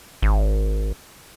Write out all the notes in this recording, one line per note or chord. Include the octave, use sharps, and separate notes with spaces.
G#1